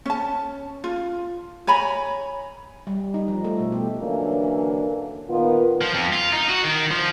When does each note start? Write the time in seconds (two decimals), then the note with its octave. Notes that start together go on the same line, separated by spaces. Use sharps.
0.06 C#4 A5
0.84 F4
1.67 C#5 G#5 A#5 B5
2.87 G3
3.14 D#4
3.28 F3
3.44 A3
3.59 B2
3.72 G4
4.02 D3 E3 F#3 A#3 C#4 D4
5.29 A#2 D#3 A#3 B3 F4
5.81 F3
5.94 F2
6.13 F4
6.32 D#4
6.49 F#4
6.64 D#3
6.91 F3